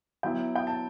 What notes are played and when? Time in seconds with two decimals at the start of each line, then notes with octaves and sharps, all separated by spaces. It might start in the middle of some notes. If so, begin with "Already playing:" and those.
0.23 F#3 B3 E4 G5
0.56 G5
0.67 A5